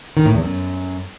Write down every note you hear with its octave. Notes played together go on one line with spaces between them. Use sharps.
D#3
A2
E2
F#2